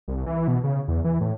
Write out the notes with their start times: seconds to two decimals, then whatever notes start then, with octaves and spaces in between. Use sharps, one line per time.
0.08 C2
0.26 E3
0.48 B2
0.64 C#3
0.88 E2
1.04 E3
1.20 A2